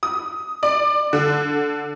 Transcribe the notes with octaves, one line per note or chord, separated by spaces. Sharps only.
D#6
D5
D3